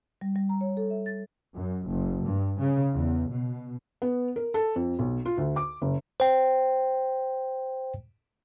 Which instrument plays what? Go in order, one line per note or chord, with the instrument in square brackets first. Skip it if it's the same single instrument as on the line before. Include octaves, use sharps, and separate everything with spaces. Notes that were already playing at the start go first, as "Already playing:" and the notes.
[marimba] G3
G3
A#5
C#5
A4
E5
A6
[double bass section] F#2
F#1
G2
C#3
E2
B2
[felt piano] B3
A#4
A4
F2
B1
F4
D2
D6
F#1
[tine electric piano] C5 G5